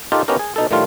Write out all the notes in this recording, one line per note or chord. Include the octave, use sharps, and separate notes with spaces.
D#4 F4 G4 A4 A#4
B3 C#4 D#4 F#4 G4 A#4
G#4
B2 D#4 A4
A2 D#3 F3 G3 A3 F4